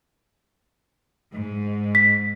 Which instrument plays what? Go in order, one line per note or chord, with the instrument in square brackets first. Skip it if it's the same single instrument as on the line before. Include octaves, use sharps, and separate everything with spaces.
[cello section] G#2
[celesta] B6